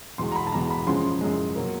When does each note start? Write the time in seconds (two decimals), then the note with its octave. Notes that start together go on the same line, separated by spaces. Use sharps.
0.18 E2 B2 G#3 C6
0.32 A#5
0.36 B5
0.47 A5
0.52 E2 B2 G#3 A#5
0.70 B5
0.87 F#2 C#3 F3 G#3 C6
1.21 F#2 C#3 F3 G#3
1.56 B2 F#3 A#3